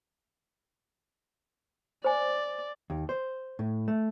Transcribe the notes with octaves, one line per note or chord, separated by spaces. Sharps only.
C5 D5 G#5
D#2
C5
A2
A3